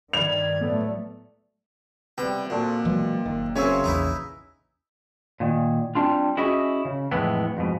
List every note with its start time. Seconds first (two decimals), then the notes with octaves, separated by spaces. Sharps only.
0.13 G2 D#3 D5 G#6 F7
0.61 A2 F#3 A3 B3
2.18 C3 G3 B3 G5
2.50 A#2 F#4 A4 C5
2.85 B2 E3 F#3 G#3
3.26 F#1 D#3
3.56 C#3 F#3 A#3 C4 C#5 E5 G#5
3.84 A#1 E2 D#4 E4 B4
5.40 A#2 D#3
5.95 G3 C4 D4 F4
6.37 C#4 E4 F#4 G#4 D#5 E5
6.85 C#3
7.11 F2 A2 E3 G#3 B3
7.57 F2 G#2 B2